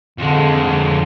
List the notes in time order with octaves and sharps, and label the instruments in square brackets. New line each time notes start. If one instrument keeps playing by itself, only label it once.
[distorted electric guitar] F2 G#3 [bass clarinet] D3
[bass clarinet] D3